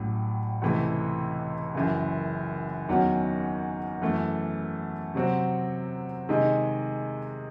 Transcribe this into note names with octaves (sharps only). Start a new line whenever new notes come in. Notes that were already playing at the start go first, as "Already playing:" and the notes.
Already playing: A1 A2 F#3
C#2 C3 E3 A3
F#1 F#2 E3
E2 D#3 F#3 C#4 F#4
F#2 E3 A3
C3 F#3 C4 F#4
C3 D#3 G#3 D#4 G#4